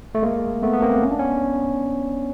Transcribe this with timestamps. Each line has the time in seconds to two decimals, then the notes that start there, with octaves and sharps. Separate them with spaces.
0.15 A3
0.22 G#3 A#3
0.62 A3 B3
0.73 B3
0.83 A#3 C4
1.03 C#4
1.11 D4
1.19 B3 C#4